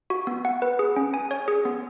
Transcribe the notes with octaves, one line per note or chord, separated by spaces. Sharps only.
F#4
B3
F#5
B4
G#4
C#4
G#5
C#5
G#4
B3